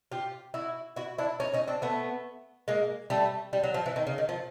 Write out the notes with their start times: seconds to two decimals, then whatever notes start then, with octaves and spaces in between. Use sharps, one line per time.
0.12 F4 G4
0.54 E4 F#4
0.96 E4 F#4
1.18 D4 E4
1.40 C#4 D#4
1.54 C#4 D#4
1.68 C4 D4
1.82 A3 B3
2.68 G#3 A#3
3.10 G3 A3
3.53 G3
3.63 F#3
3.74 F3
3.86 E3
3.96 D#3
4.07 C#3
4.18 D#3
4.29 F3